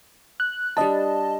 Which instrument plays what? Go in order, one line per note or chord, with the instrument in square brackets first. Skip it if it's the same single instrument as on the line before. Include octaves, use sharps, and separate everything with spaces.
[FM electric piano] F#6
[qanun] G3 D4 B5 [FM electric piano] D#5 A5